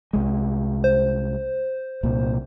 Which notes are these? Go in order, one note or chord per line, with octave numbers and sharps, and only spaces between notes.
C2 G#3
C5
C2 A#2